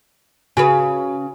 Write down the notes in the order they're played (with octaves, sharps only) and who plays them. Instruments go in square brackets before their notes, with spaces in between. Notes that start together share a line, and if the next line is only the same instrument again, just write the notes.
[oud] C#3 G#4 B4 [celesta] F#4 G#5